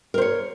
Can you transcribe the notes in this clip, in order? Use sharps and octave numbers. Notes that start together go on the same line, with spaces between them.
A#4 C5 C#5